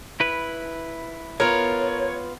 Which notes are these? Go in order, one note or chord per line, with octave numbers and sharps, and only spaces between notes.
E4 B4
B3 F4 A#4 C#5